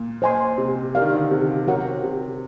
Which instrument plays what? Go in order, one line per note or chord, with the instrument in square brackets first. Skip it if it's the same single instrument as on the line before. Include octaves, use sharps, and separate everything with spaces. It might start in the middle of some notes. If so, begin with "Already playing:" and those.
Already playing: [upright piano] A#2
[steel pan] C5 D#5 G#5 C6
[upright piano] C3
[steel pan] G4 A#4 D5 F5
[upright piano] D#3
D3
C3
[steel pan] F#4 A#4 C#5 F#5
[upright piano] C3